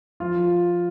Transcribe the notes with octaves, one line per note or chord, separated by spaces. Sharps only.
F3 F4
F3